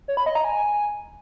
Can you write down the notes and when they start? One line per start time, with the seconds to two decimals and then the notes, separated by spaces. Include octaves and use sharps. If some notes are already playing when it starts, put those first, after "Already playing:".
0.08 C#5
0.17 B5
0.26 D#5
0.35 A#5
0.44 G#5